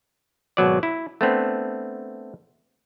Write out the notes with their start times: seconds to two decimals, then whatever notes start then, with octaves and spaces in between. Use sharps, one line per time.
0.57 G#1 B2 F#3 D5
0.83 E4
1.21 A3 B3 C4 D4